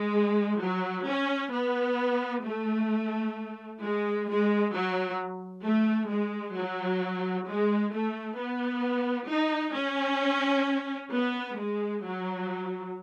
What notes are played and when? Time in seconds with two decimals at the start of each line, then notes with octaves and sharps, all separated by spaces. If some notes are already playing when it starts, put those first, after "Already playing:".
Already playing: G#3
0.61 F#3
1.07 C#4
1.53 B3
2.44 A3
3.81 G#3
4.27 G#3
4.73 F#3
5.64 A3
6.10 G#3
6.55 F#3
7.47 G#3
7.93 A3
8.38 B3
9.29 D#4
9.75 C#4
11.12 B3
11.58 G#3
12.04 F#3